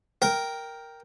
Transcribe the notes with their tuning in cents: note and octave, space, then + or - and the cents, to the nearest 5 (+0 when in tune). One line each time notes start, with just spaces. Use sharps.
A#4 +0 G5 +0